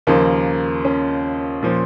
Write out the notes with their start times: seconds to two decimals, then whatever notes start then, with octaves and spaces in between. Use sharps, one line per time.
0.07 D#2 C#3 F3 A#3
0.85 C#4
1.63 A#2 F3